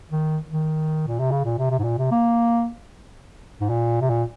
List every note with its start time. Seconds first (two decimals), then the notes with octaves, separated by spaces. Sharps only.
0.11 D#3
0.51 D#3
1.07 A#2
1.19 C3
1.31 C#3
1.45 A#2
1.58 C3
1.70 C3
1.79 G#2
1.84 A#2
1.98 C3
2.11 A#3
3.61 G#2
3.70 A#2
4.01 C3
4.10 A#2